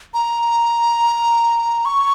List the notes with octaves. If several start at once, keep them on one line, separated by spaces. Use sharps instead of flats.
A#5
C#6